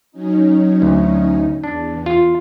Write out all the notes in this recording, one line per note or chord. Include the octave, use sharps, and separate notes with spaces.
F#3 C#4 D#4
D2
E2 D4
F4